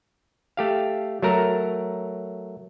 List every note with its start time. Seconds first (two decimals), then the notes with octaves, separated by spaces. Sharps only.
0.57 A3 G4 F5
1.22 F#3 A3 A#4 A#5